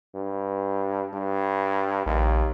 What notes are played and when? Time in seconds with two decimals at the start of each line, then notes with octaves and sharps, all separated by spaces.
0.15 G2
1.14 G2
2.06 A#1 D#2